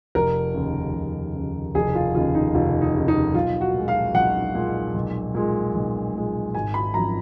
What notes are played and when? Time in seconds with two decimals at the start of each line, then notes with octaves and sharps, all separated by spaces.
0.15 F1 A#4
0.54 D#2 C#3
0.94 F1
1.35 D#2 C#3
1.75 F1 G#4
1.95 F4
2.14 D#2 C#3 F4
2.35 D#4
2.55 F1 F4
2.82 D#4
2.95 D#2 C#3
3.08 D#4
3.35 B1 F4
3.61 F#4
3.74 A#2 G#3
3.88 F5
4.14 B1 F#5
4.55 A#2 G#3
4.94 B1
5.34 A#2 G#3
5.75 B1
6.15 A#2 G#3
6.55 G#1 G#5
6.74 B5
6.94 F#2 F3 A#5